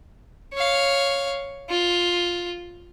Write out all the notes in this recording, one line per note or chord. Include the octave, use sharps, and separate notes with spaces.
C#5 F5
F4